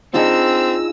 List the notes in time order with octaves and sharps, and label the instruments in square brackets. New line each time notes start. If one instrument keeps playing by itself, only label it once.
[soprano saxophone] C4 [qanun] D4 D#4 G#4 [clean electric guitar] F4 D#5 [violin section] E6